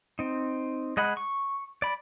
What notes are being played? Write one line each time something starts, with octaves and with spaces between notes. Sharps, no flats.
C4 D#4
G#3 D#5 F#5 B5
C#6
D5 B5